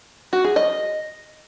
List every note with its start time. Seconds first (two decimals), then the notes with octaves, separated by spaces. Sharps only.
0.33 F#4
0.44 G#4
0.56 D#5